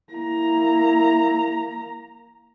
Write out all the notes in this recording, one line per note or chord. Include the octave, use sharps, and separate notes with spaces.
A#3 E4 A#5